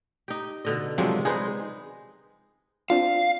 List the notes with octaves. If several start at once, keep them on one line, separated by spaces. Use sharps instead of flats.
D#4 G4
B2 D3 D#5
C3 F3 F#3 G#3 C4 D4
G#3 D#4 G#4 B4 C5
C4 D4 F4 F5